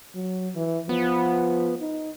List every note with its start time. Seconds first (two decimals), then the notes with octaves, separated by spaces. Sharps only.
0.15 F#3
0.55 E3
0.89 F3 B3
1.81 D#4